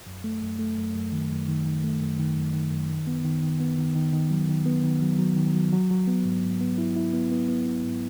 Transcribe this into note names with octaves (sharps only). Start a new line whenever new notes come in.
F#2
A3
F#2
A3
F#2
F#2
D#3
F#2
D#3
D#3
A3
F#2
D#3
F#2
D#3
F#2
D#3
B3
D#3
D#3
B3
D#3
D#3
D#3
F#3
D#3
B3
D#3
F#3
F#3
D#3
F#3
F#3
F#3
B3
G#2
G#2
B3
E4
E4
B3
B3
B3
B3
G#2